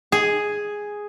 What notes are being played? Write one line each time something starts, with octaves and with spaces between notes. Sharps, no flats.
G#4